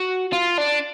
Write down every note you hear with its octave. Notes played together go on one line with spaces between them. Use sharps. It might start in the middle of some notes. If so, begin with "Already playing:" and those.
Already playing: F#4
F4
D4